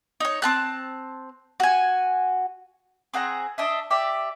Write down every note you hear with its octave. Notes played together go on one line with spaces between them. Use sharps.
D#4 C#5
C4 A5 F#6
F#4 G#5
C4 G#4 F#5 A#5
D4 D#5 E5
G4 D5 E5